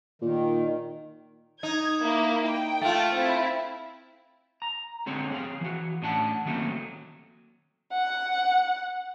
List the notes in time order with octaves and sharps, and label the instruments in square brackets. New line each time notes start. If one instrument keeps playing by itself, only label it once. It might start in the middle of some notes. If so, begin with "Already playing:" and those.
[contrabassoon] A#2 [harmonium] D#3
[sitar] D#4 [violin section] G#6
[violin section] A#3 E4
G5
[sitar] A3 F4
[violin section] C4 E4
[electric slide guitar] A#5
D3 G#3 C4 C#5
C4 G#4 F5
E3 F#4
A2 C#4 D4 F#5 A5
D#3 F#3 A3 A#3 C4 C#4
[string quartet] F#5